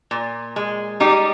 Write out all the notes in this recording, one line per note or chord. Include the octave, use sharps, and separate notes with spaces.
A#2
G#3
G3 D#4 G4